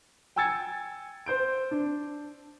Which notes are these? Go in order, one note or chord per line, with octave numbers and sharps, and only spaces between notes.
G5 G#5 E6 G#6 A6 C#7
C5 G6 D7
D4